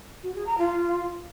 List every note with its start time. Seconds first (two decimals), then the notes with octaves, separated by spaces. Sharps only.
0.23 F#4
0.35 G#4
0.46 A#5
0.58 F4